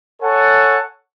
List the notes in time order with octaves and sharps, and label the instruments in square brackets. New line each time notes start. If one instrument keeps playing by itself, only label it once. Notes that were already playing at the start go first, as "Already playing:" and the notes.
[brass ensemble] A4 C#5 F#5 G#5 A5